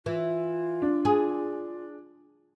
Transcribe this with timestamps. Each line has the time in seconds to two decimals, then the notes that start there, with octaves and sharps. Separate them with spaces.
0.06 E3 F4
0.82 D4
1.05 G#4